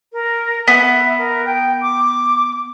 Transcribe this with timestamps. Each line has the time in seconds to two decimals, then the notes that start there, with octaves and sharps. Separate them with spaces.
0.13 A#4
0.68 B3 E5
1.18 A#4
1.46 G5
1.82 D6